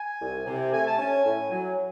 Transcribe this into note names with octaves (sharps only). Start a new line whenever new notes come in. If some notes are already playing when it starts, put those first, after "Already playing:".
Already playing: G#5
C2
C3
A3 G#5
A5
C#4 G#5
A2
F#3